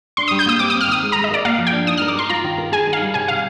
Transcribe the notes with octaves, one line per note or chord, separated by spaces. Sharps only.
D4 C6
D#6
G3
G6
A#3 D#6
C4 D6
D#6
C4
F6
D#3 D#6
G#3
A#5
G#3
D#5
A#4 D5
A#3 F5
F3
G5
D4
D#4 D#6
F6
A#4
D6
A#4 C6
F4 A#5
D#3
A#4
G#4 G#5
D#4
F5
G3
C3 G#5
D#3 F5